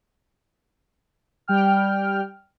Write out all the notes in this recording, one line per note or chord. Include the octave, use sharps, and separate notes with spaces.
G3 G5 F6